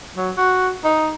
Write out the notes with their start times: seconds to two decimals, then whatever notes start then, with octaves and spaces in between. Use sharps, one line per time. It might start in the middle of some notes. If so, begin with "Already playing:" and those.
0.16 F#3
0.37 F#4
0.84 D#4